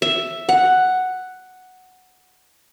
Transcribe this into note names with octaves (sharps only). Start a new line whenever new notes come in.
E5
F#5